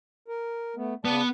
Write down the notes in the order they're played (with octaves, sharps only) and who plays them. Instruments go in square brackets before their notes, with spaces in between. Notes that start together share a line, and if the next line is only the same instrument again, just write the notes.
[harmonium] A#4
A3 B3
[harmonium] C#3 D5 A5 [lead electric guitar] B3